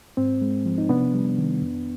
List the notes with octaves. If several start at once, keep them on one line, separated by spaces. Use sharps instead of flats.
G#2 C4
G#3
F3
D#4
C3 B3 D4
G3
D#3
F2